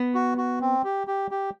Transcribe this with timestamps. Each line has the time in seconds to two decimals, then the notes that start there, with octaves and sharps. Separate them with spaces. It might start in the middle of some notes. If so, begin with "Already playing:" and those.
Already playing: B3
0.15 F#4
0.38 F#4
0.61 C4
0.84 G4
1.07 G4
1.31 G4